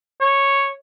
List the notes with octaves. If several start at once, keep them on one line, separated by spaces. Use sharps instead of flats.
C#5